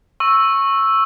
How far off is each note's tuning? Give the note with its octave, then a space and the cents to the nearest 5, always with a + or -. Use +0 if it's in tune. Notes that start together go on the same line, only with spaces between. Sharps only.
C#6 -15 E6 +0